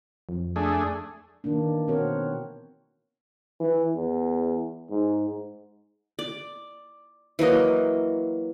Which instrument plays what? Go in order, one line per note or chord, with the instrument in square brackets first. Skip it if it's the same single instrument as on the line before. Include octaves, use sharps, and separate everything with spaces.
[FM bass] F2
[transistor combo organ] A3 D4 G#4
[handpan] D#3 E3 A#3 D4
B2 C4 F#4 A#4 C#5
[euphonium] E3
E2
G#2
[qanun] D5
E3 F#3 A#3 D#5